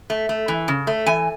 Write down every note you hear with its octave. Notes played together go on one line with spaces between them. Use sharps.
A3
A3
E3
C#3
A3
E3 G#5